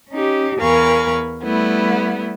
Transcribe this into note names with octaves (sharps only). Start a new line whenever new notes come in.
C#4 D#4 G4
E2 A#4 F5 G#5 B5 C#6
G3 A3 B3 E4